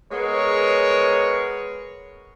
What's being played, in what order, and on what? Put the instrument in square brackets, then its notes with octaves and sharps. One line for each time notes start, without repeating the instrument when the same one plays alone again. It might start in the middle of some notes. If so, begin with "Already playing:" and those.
[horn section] G#3 B3 G#4 A#4 C#5